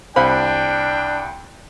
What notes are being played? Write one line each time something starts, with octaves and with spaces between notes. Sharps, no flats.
C2 D4 C5 F5 G5 B5